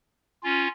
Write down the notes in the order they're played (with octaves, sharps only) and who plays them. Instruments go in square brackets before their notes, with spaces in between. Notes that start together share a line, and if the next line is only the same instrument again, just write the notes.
[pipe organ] C#4 F4